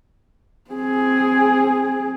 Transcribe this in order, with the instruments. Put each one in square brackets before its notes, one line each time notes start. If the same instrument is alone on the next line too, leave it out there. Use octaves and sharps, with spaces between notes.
[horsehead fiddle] C4 G#4